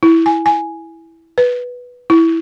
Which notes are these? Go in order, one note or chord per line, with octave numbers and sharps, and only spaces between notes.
E4
G#5
G#5
B4
E4